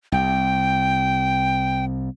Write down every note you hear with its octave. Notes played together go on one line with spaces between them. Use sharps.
C2 G5